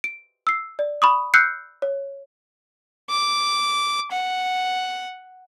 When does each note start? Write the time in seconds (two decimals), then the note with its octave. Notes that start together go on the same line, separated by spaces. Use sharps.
0.04 D7
0.47 E6 C7
0.79 D5
1.02 B5 C#6 D#6
1.34 E6 F#6 G6 C7 C#7
1.82 C#5
3.09 D6
4.11 F#5